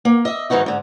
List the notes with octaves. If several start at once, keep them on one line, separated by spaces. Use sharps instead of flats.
A#3
D#5 E5
G#2 D#3 E3 D#4 F#4
G#2 D3